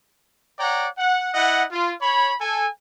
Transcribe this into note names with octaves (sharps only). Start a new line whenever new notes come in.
C#5 D5 F#5 G5 A#5
F#5
E4 D#5 F#5
F4
C#5 B5
A4 G#5